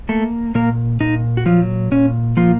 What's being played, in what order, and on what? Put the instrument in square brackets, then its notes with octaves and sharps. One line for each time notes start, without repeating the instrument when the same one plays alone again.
[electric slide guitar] A3 A#3 A4
A#2 A#3 A#4
A#2 D#4
F#4
F3 F#3 F4
A#2 C#4
F3 A#3 F4